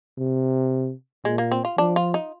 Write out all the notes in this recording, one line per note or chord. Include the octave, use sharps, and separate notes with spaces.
C3
A#2 G#3
A#3
C4
F4
F3 D4
F4
D#4